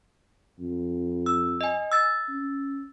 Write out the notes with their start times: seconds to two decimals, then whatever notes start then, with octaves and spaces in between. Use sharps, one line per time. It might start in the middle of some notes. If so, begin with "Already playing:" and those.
0.59 F2
1.26 E6
1.61 D#5 G#5
1.92 E6 A6
2.29 C#4